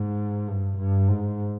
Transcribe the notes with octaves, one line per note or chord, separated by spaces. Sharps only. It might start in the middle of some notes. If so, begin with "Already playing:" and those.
Already playing: G#2
G2
G2
G#2